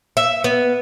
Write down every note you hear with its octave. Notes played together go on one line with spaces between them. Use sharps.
E5
B3